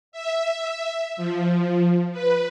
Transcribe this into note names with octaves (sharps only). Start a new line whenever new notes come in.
E5
F3
B4